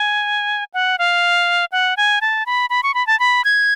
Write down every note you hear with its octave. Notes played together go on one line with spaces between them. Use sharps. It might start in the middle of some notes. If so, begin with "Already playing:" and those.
Already playing: G#5
F#5
F5
F#5
G#5
A5
B5
B5
C#6
B5
A5
B5
G#6